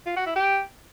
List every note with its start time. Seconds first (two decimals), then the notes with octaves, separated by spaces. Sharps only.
0.06 F4
0.16 F#4
0.26 E4
0.36 G4